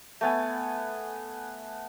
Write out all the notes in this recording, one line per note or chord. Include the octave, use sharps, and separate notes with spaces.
A3 B3 G#5